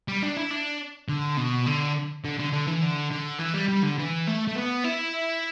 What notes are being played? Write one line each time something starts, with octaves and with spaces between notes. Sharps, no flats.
G3
D4
E4
D4
D3
B2
D3
D3
D3
D3
E3
D3
D3
E3
G3
G3
D3
E3
A3
A3
B3
E4